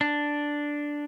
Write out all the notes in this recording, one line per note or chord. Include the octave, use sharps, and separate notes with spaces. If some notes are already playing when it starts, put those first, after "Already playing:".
D4